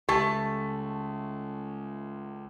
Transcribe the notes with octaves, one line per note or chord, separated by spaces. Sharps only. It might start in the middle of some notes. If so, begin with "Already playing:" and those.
C#2 A3 G4 A5